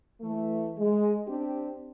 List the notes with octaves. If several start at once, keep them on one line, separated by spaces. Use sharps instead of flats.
E3 A3
G#3
C4 D4 G4